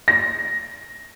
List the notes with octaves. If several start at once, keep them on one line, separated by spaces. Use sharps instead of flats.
A#6